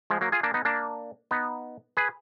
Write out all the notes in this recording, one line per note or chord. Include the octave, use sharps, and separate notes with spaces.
F3 G#3
F#3 A#3
F4 G#4
A#3 D4
B3 D#4
A#3 D4
B3 D#4
G#4 B4